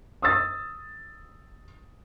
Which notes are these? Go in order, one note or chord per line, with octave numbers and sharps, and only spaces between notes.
D#6 E6 A6